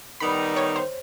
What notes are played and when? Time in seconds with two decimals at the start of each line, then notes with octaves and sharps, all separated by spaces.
0.20 D#3 G3 B3 D#4 B5
0.57 C#5
0.76 C5